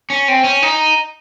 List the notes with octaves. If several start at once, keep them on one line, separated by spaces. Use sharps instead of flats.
C#4
C4
C#4
D#4